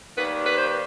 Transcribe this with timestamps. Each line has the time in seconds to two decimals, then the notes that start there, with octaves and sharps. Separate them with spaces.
0.17 D#2 D#3 G3 A#3 B4
0.46 B4
0.57 C5